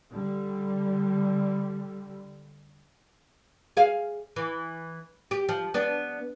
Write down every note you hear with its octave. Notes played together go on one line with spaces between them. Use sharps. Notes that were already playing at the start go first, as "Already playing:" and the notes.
D3 G3
G#4 F5
E3
G4
F3
B3 D4